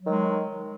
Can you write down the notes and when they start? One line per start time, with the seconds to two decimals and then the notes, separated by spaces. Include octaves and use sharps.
0.02 F#3
0.05 D#3
0.09 G#3